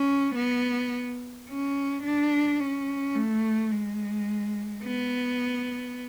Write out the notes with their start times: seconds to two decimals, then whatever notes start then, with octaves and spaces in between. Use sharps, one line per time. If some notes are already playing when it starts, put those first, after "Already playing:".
Already playing: C#4
0.36 B3
1.49 C#4
2.04 D4
2.60 C#4
3.15 A3
3.72 G#3
4.83 B3